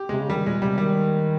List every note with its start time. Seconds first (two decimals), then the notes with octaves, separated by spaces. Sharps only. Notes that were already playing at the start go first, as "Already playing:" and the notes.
Already playing: G4
0.09 C3 G#3
0.21 C#3
0.30 D#3 G3
0.46 A#2 G#3
0.62 C3 G3
0.78 D#3 G3